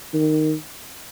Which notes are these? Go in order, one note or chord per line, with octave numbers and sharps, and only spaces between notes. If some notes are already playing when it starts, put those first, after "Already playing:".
D#3